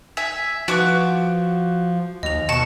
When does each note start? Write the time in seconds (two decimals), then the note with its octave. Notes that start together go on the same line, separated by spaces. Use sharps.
0.17 E5 G#5
0.68 F3 F#4 B4 D6 D7
2.23 D#2 D#5 F7
2.49 B2 A5 C#6 E7